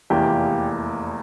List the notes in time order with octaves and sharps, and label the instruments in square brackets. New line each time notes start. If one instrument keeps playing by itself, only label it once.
[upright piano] F1 E2 E3 A#3 F4 [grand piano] G4